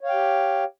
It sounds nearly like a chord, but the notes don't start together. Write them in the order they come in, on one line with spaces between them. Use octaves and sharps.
C#5 F5 G5 G4